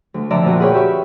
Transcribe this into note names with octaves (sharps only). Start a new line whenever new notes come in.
D2
F2 D3 D5 E5 A5 A#5
A#2 F4 F#4
G#4 B4 C#5 G5
G4 E5 C#6